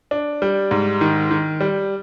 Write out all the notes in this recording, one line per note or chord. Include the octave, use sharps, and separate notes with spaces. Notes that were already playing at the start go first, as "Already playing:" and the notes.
D4
G3
G#2
D#3
D#3
G3